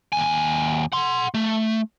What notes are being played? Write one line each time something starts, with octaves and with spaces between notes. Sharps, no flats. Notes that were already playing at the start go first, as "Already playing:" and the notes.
D#2 G#5
F#5 C6
A3